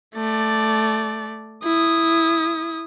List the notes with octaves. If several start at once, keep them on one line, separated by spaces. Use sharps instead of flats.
A3 D5
E4 D#6